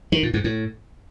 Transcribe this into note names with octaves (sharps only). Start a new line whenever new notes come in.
D#3
A#2
G#2
A2